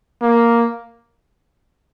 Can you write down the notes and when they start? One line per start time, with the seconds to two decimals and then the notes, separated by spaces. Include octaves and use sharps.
0.22 A#3